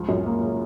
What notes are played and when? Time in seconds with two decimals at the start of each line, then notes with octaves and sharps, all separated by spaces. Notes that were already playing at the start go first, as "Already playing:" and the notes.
Already playing: C#2 F3
0.09 F#2
0.26 A#3
0.43 C#3